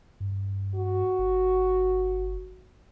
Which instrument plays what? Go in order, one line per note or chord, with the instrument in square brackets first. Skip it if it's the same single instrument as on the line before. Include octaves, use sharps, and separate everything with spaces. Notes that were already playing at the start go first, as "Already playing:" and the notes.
[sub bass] G2
[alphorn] F#4
[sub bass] G1